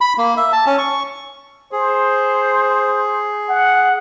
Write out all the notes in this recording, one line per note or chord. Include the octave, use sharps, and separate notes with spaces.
B5
A#3
E5
A5
C#4
C#6
G#4 C5
F#5